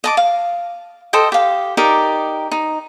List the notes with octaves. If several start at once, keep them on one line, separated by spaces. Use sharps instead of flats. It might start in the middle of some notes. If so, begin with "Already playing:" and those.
D#5 A5 D6
F5
A4 C5 D#5 G5
G4 F5
D#4 G4 A#4 D5
D#4